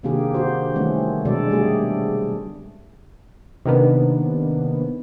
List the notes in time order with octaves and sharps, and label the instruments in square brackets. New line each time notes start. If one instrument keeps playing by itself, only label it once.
[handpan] C3 D#3 A#3 D4 G4 G#4
D3 C4 F#4 C5
D#3 E3 G3 A3 C4 C#4
B2 D3 F#3 G#3 A4 D5
G3 A3 G4 G#4
[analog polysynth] C3 D#3 A#3 B3 D4